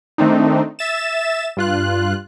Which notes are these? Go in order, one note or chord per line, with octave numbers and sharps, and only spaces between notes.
D#3 A3 C4 D4 D#4
E5 A6 E7
G2 F4 F#6